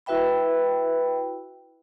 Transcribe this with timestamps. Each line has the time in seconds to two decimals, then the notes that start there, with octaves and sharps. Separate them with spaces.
0.06 E4 F#4 B4 E5 G5 B5